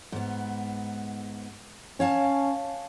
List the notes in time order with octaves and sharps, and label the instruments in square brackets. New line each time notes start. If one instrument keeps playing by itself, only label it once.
[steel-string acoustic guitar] G#2 B3
[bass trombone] C#4 [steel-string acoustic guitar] C#5 F5 A5